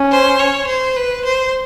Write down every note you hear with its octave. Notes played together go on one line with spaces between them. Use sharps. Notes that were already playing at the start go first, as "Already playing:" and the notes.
Already playing: C#4
C5
C#5
C5
B4
C5